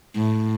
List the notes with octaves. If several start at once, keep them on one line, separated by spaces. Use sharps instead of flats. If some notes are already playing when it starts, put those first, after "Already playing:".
A2